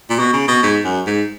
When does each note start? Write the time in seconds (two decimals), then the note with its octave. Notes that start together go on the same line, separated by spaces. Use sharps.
0.10 A#2
0.19 B2
0.33 C#3
0.48 B2
0.63 G#2
0.84 F#2
1.06 G#2